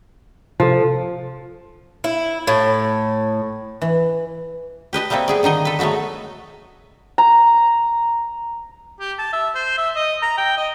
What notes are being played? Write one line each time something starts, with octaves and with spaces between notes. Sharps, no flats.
C3 F3 A4
E4
A2
E3
G4 B4 D#5 A5
G3 A3 A#3 C4 A4
B3 G#4 D5
D3 D#3 D#4 D#5
A4 B4
F#3 G#3 A3 B3 F#4
A#5
G4
A5
E5
C5
E5
D#5
A#5
G5
D#5